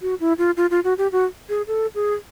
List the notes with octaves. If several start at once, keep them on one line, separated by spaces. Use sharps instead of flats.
F#4
E4
F4
F4
F4
F#4
G4
F#4
G#4
A4
G#4